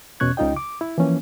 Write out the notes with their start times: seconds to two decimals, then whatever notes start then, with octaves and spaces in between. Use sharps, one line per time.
0.20 E2 B2 C#4 C#6 F#6 G#6
0.37 C#2 C#3 D#4 F4 D#5 G5
0.56 D6
0.81 E4
0.98 E3 F3 A#3 C#4